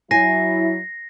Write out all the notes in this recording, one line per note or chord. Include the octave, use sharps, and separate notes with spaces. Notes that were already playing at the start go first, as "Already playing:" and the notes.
F#3 E4 G#5 A#6 C7